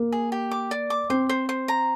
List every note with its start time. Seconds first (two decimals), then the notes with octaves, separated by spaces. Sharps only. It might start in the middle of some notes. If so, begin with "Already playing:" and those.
Already playing: A#3
0.12 G#4
0.32 G4
0.51 D6
0.71 D5
0.90 D6
1.10 C4 C5
1.29 C5
1.49 C5
1.68 A#5